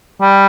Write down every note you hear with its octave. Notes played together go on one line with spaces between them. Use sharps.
G3